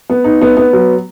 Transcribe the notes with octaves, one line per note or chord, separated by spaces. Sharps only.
B3
D#4
B3
B3
F#3